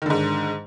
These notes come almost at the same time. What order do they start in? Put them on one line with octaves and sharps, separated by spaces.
D#3 D3 G#2